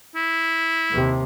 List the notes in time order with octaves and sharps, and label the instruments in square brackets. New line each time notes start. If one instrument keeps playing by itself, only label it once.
[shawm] E4
[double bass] D#2 C3